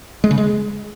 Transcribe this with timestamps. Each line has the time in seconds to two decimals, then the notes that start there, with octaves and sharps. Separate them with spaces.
0.24 G#3
0.31 C#3
0.38 G#3